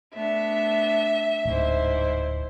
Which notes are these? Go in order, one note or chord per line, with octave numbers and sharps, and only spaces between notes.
A3 B3 D4 E5
D1 G#2 E4 C5